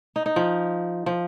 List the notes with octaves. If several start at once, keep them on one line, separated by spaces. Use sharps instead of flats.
D#4
D#4
F3
F3